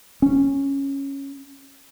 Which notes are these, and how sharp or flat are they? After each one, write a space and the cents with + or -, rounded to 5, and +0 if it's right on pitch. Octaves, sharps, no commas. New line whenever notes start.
C#4 -5